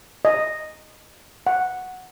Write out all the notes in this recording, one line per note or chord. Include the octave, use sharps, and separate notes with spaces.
D#5
F#5